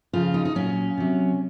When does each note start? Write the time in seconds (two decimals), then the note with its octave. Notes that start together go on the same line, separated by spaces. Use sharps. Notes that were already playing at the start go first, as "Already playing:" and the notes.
0.13 C#3 F3 F4
0.34 D#4
0.45 D#4
0.55 A#2 F#3 C#4
0.97 C3 F#3